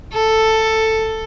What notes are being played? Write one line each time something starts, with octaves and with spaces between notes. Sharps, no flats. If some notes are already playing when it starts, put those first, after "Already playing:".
A4